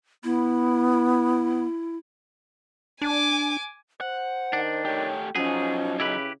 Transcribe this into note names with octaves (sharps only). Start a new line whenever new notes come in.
B3 E4
D4 G#5 D6
C5 F#5
D#3 D4
A3 G4 C#5
F3 F#3 C#4 D#4 G#4
C#3 E4 G4 B4